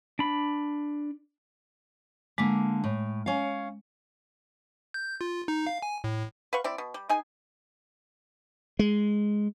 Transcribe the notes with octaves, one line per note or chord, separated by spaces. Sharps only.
D4 B5
D3 G#3 A#3
A2
C#4 F5
G6
F4
D#4
F5
G#5
A2
B4 F5 F#5 C#6
C4 E4 D5
B2
G3
D#4 G#4 G#5
G#3